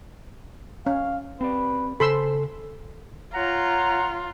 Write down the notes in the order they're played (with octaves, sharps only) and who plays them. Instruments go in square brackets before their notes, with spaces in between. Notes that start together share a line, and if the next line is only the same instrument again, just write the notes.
[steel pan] C#4 [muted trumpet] F5
[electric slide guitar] C4 G4 D5 [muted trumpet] B4
[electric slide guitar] C#3 G#5 [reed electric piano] A4 [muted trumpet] C5 [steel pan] B5 C6 E6
[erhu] F4 [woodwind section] C#5 F#5 A#5